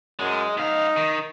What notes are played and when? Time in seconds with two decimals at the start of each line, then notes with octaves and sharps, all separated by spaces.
0.19 F#2 G#3
0.57 G#2 D#4 F5
0.96 D#3